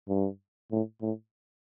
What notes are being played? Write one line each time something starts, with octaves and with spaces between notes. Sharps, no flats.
G2
A2
A2